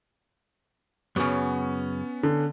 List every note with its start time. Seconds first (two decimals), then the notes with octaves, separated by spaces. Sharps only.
1.16 F#2 A2 C#3 B3 C#4
2.23 D3